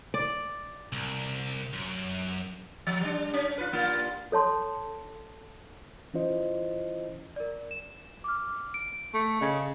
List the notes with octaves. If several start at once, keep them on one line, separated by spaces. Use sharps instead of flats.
D5
C2
F#2
F3
G3 D4
C#4
F4 B4
G2 A#3 F4
A4 C#5 A5 C6
E3 C#4 E4 F4 C5 D#5
A#4 D5
E7
D6 F6
D7
A3
C#3 D#5